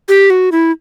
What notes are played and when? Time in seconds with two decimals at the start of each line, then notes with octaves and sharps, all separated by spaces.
0.09 G4
0.30 F#4
0.52 E4